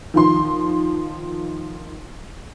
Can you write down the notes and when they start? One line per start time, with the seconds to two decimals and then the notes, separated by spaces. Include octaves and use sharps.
0.14 D#3 F3 C6